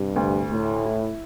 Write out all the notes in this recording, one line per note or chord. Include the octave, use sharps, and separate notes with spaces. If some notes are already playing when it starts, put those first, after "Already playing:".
Already playing: G2 C3
D2
A2 A3
E4